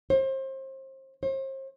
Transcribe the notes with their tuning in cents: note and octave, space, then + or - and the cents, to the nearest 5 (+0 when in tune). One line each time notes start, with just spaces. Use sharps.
C5 +30
C5 +40